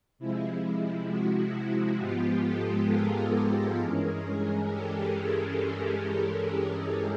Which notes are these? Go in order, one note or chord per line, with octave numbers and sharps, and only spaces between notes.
C3 F3 G#3 E4
E4 F#4
E4 F#4
G#2 F3 G#3 B3 F4 G4
G4 A4
G#4 A#4
G#4 A#4
G2 E3 G#3 C#4
G4 A4